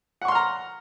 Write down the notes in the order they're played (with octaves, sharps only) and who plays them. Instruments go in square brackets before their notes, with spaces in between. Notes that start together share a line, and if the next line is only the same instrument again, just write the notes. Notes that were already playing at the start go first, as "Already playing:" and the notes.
[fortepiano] F#5
C#6
C6
F6
A#5